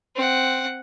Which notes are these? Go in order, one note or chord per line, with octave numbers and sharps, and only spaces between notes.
C4 F#5